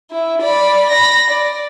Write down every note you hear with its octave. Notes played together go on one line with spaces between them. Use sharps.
E4
D5 B5
B5 A#6
D5